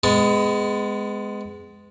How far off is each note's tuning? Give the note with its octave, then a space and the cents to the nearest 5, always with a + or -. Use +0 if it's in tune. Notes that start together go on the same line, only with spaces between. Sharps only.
G#3 +0 B3 +30